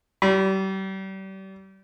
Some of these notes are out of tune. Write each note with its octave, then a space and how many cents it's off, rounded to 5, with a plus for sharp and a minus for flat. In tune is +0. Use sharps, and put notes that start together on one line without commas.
G3 -35